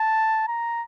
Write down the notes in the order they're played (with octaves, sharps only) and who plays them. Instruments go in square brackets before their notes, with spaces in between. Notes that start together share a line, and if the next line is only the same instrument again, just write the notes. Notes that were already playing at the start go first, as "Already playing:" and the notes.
Already playing: [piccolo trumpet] A5
A#5